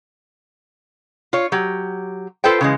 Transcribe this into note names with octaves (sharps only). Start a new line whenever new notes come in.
F4 C#5
F#3 G4
F4 A4 B4 C5 G5
C#3 E3 G#3